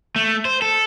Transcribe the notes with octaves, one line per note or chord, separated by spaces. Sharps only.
A3
C5
A4